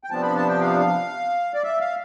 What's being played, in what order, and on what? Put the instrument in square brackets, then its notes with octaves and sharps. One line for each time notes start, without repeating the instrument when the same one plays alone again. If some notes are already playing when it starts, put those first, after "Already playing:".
[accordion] G5
C3 F3 B3 D4 A5
B5
A5
G5
F5
D5
E5
F5